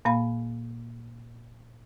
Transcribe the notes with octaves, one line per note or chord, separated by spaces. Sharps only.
A#2 A#3 F5 B5